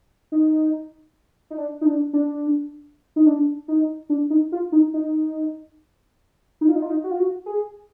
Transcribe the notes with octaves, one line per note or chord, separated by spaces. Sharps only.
D#4
D#4
D4
D#4
D4
D4
D#4
D4
D#4
D4
D#4
F4
D#4
D#4
D#4
F4
D#4
F4
D#4
F#4
F4
F#4
G#4